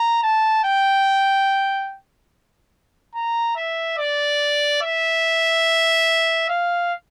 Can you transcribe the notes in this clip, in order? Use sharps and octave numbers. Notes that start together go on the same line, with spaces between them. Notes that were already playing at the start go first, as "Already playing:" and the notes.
Already playing: A#5
A5
G5
A#5
E5
D5
E5
F5